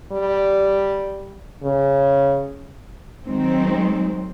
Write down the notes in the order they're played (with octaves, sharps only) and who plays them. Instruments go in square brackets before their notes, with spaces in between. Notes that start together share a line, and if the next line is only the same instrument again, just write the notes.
[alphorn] G3
C#3
[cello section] D#3 F#3 G#3 C4